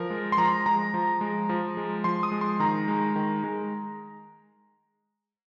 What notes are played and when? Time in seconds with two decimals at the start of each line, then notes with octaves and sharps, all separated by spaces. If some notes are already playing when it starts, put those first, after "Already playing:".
Already playing: F3 A#4
0.10 G#3
0.32 C6
0.37 F3 A#5
0.66 G#3 A#5
0.94 F3
1.21 G#3
1.49 F3
1.77 G#3
2.04 F3 C6
2.23 D#6
2.32 G#3
2.41 C6
2.60 D#3 A#5
2.88 G#3
3.16 D#3
3.44 G#3